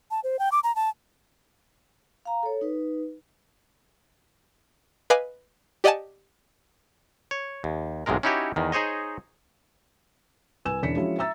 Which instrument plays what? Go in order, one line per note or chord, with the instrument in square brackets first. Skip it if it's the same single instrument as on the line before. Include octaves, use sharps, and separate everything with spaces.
[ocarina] A5
C5
G5
D6
A#5
A5
[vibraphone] F5 A#5
A4 C#5
D#4 B4
[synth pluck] B4 D#5 F5 G#5 D6 B6
G4 D5 D#5 F#5 G#5 A5
[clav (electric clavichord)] C#5
D#2
B1 G#2 C3 G#3 A#4
C#4 D#4 E4 F#4 G4 C#5
E2 D#3
D#4 G#4 C5 C#5 D#5
[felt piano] C2 B4 G#5 E6 E7
E1 E3 C#4 D4 B6 C#7
F3 G#3 C#4 E4 F#4
E5 A#5 E6 A6